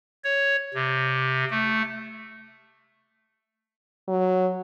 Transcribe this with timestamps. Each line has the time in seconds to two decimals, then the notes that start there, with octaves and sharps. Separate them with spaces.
0.24 C#5
0.74 C3
1.51 A3
4.08 F#3